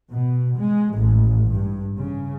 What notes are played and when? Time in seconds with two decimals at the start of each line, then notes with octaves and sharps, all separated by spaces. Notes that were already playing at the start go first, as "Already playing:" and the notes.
0.11 B2
0.60 G#3
0.95 A1
1.51 G2
2.00 C#3